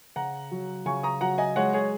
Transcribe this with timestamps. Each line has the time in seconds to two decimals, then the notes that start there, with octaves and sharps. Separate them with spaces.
0.16 C#3 F#5 A#5
0.51 F#3
0.86 C#3 G#5 C#6
1.03 A#5 D#6
1.21 F#3 F#5 A#5
1.38 D#5 G#5
1.56 G#3 C#5 F#5
1.73 G#4 C#5